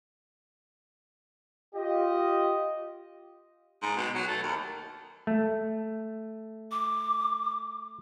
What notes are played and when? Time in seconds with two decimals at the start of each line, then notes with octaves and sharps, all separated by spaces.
1.75 F4 G4 D#5
3.82 G#2
3.97 B2
4.15 F#3
4.28 A3
4.42 D#2
5.27 A3
6.71 D6